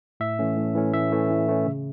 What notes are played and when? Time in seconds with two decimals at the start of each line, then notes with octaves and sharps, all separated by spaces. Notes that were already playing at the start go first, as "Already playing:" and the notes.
0.20 A2 E5
0.39 E3 A3 C#4
0.57 A2
0.75 E3 A3 C#4
0.93 A2 E5
1.12 E3 A3 C#4
1.30 A2
1.48 E3 A3 C#4
1.66 C#3